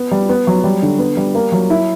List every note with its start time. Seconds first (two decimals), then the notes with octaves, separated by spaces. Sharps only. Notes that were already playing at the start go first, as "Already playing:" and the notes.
Already playing: B3
0.11 G3
0.29 B3
0.47 F#3
0.64 G3
0.83 D3
0.99 B3
1.17 G3
1.35 A#3
1.52 F#3
1.70 E4